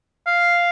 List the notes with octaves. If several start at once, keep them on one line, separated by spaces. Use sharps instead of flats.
F5